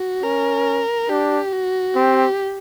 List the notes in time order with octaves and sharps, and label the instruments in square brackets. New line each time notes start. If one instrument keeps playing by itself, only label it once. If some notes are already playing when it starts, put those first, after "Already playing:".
Already playing: [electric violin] F#4
[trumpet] C#4 [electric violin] A#4
[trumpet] D4 [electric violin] G4
[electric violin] F#4
[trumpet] C4 [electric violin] G4